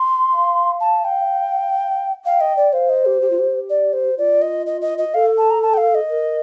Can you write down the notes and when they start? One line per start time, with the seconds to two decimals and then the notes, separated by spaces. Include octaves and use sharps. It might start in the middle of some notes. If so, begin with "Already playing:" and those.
Already playing: C6
0.33 F5
0.81 A5
1.05 G5
2.25 F5 G5
2.41 D#5
2.57 D5
2.73 C5 F5
2.89 D#5
3.05 G4
3.22 G4
3.30 F4
3.39 G4
3.70 D5
3.93 C5
4.18 F4 D5
4.42 D#5
4.66 D#5
4.81 D#5
4.98 D#5
5.14 A4 F5
5.38 A5
5.50 A#5
5.62 A5
5.74 G5
5.78 F5
5.95 D#5
6.10 A#4